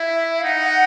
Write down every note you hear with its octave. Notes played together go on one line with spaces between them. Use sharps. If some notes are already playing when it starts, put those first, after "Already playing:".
Already playing: E4 E5
F5
D#4 F#5